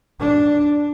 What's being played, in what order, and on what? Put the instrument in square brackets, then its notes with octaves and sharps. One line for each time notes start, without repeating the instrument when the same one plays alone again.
[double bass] D4